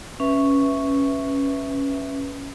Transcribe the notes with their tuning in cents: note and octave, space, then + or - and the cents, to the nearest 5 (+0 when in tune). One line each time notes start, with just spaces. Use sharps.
C#4 +0 B4 +0 E5 +0